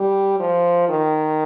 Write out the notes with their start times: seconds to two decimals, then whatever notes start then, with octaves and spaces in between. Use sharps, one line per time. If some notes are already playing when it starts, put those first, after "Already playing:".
Already playing: G3
0.40 F3
0.89 D#3